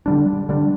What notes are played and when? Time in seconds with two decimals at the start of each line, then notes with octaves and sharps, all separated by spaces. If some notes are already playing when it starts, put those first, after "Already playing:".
0.06 D3 G3 D4
0.49 D3 G3 D4